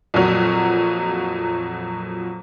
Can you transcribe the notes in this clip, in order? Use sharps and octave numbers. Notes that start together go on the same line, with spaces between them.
F2 A#2 F#3